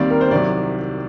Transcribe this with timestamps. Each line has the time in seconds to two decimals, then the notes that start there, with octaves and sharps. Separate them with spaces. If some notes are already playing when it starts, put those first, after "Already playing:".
Already playing: D#2 D#3 G3 C4 D5
0.10 A#4
0.21 C5
0.31 C2 C3 D#3 F#3 D5